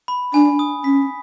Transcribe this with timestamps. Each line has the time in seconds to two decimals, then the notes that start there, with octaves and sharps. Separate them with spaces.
0.08 B5
0.34 D4 G#5
0.59 D#6
0.84 C#4 B6